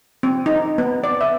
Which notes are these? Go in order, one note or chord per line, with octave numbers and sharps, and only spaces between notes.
C4
D#4
B3
D5
E5